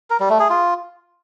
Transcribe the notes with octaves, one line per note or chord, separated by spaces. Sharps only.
A#4
G3
A3
G#4
F4